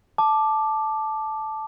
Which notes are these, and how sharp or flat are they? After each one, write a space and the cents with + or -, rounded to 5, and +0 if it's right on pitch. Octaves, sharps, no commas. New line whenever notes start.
A5 -10 D6 +10